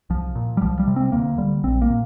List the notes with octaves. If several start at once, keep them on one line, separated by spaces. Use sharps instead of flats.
C2 F3
A#2
G3
C2 F3
G3
C3
C4
D2 A#3
D3 G3
A#1 C4
A#3
A#2